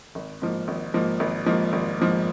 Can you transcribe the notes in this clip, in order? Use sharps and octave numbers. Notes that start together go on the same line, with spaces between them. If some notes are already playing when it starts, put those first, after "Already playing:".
G#1
G#2 F3 A#3
G#1
G#2 F3 A#3
G#1
G#2 F3 A#3
G#1
G#2 F3 A#3